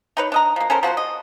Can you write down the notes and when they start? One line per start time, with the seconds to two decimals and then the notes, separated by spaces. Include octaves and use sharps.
0.17 D#4 B4 C#5
0.32 D4 D#5 A#5
0.56 F3 A#3
0.70 C#4 A4 A#4 C5
0.83 F3 F#4 G4 C5
0.97 D#5